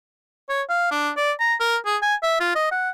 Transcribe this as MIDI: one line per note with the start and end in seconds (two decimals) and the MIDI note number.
0.49 0.62 73
0.69 0.88 77
0.91 1.10 62
1.17 1.32 74
1.40 1.55 82
1.60 1.76 70
1.86 1.97 68
2.02 2.15 80
2.23 2.37 76
2.40 2.55 65
2.56 2.67 75
2.71 2.90 78